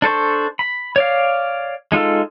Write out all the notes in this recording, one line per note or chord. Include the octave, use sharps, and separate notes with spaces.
D4 A4 C5 C#6
B5
C#5 D5 F5
G#3 D#4 F4 A4